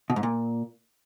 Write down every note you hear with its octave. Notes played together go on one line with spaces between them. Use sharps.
B2
G#2
A#2